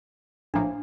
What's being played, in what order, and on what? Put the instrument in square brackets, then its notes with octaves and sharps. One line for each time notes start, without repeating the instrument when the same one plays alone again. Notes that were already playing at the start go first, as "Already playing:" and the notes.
[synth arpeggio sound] A#1 A2 F3 A#3 [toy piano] D4